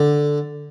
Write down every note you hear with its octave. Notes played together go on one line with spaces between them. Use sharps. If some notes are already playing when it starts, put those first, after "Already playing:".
Already playing: D3